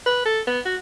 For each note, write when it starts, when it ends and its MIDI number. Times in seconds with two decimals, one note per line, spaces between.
0.06 0.23 71
0.25 0.41 69
0.47 0.60 59
0.65 0.76 66